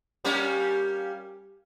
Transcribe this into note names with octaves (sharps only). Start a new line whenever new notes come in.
G3 A#3 C#4